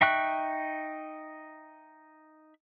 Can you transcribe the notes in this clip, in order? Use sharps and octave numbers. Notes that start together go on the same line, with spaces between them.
D#4 E5 G5 C#6 F#6